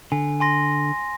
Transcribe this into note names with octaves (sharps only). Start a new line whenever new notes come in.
D3 G#5
G#5 C6 A#6